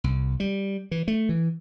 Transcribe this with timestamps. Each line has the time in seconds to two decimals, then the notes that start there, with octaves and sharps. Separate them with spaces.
0.04 C2
0.40 G3
0.91 E3
1.08 A3
1.29 E3